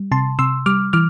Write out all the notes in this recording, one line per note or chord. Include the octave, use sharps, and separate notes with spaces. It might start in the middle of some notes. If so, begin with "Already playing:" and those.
Already playing: G3
C3 A5 C6
C3 C6 E6
G3 D6 F6
E3 D6 F6